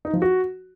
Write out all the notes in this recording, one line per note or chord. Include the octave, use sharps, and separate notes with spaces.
D#4
F3
F#4